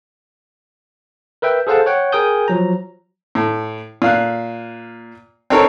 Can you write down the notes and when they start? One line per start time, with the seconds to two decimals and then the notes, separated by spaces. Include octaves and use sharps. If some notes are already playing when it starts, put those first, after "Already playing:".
1.42 A#4 B4 E5 G5
1.67 G#4 A4 C5 F5 F#5 A5
1.86 C#5 F#5 G5
2.12 G#4 A#4 G5 G#5 D#6 G6
2.48 F3 F#3 A#5
3.35 A2
4.02 A#2 F5 F#6
5.50 C4 D4 D#4 A4 A#4 C#5